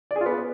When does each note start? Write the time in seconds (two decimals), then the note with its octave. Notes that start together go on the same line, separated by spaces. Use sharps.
0.11 D5
0.16 G#4
0.21 F4
0.26 B3